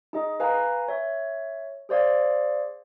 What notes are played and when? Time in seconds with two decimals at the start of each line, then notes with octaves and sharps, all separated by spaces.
0.13 D#4 G#4 D#5
0.40 B4 F5 G#5 A#5
0.88 C#5 E5
1.89 G#4 C5 D5 F5 G#6